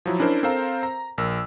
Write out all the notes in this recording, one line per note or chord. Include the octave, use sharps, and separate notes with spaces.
F3 F#3 E4
C#4 D4 E4 A#4 C5
C4 A4 A#4 C5 F5 A#5
A#5
A#1 A#4 E6